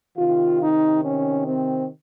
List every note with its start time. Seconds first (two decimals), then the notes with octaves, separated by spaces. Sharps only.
0.17 C3 D#3 F4
0.60 D#4
1.03 C#4
1.47 C4